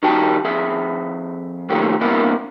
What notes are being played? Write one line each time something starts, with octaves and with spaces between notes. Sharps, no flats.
D#3 G3 F#4 G5 A5
F2 G#4 E5
A#2 D#3 F3 F#3 A3 G4
G2 C3 E3 A#3 B3 E4